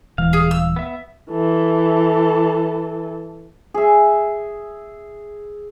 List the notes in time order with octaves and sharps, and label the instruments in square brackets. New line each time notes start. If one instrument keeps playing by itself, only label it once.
[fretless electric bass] D#1 E3 G#3 [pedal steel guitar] F5
[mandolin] G#4
E6
[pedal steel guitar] B3 E5
[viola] E3 A4
[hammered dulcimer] G#4 E5